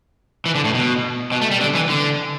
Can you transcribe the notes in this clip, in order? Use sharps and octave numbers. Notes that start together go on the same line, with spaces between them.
E3
D3
A2
B2
B2
A3
G3
D3
E3
D3